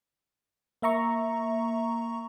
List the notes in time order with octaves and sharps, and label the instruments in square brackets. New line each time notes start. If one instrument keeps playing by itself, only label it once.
[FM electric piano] A#3 E5 A#5 C#6